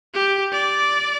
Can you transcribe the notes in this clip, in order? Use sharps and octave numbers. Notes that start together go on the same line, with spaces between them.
G4
D5